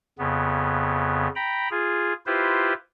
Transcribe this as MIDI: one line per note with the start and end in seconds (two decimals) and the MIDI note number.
0.19 1.28 41
0.19 1.28 49
0.19 1.28 59
1.36 1.69 79
1.36 1.69 82
1.36 1.69 83
1.71 2.13 65
1.71 2.13 68
2.26 2.73 64
2.26 2.73 65
2.26 2.73 67
2.26 2.73 71
2.26 2.73 72